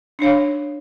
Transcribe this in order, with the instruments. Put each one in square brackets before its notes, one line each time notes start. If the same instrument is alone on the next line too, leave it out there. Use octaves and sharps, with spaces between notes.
[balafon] D4 D#4 C#5 F5